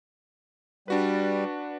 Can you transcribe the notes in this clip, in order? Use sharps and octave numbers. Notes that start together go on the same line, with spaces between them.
G3 D4 F#4 B4